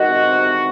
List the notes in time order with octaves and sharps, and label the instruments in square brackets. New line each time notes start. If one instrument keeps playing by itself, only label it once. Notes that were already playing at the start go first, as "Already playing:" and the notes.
Already playing: [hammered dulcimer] D#3 E3 G#3 [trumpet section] F#4
[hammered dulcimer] C3
C3